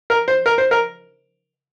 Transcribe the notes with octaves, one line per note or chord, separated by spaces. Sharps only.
A#4
C5
A#4
C5
A#4